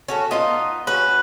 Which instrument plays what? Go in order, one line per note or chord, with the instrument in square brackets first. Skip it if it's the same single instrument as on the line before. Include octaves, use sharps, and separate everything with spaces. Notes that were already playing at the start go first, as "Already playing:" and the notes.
[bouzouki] C#4 F#4 A4
[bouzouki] B3 D#4 [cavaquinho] F4 D#5
[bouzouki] C#4 F#4 [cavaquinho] B4